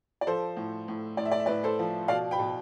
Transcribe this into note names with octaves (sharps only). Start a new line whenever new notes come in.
D5
F3 A4 C5
A2
A2
A2 D5
E5
D5
E5
A2 B4 D5
A4 C5
F3
B2 D5 F5
G5 B5
B2